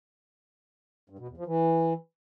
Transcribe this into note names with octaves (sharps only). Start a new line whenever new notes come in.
G2
B2
E2
F3
E3